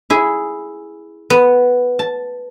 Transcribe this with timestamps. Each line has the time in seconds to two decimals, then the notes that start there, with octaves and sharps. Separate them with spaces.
0.10 E4 G#4
1.30 B3
1.99 A5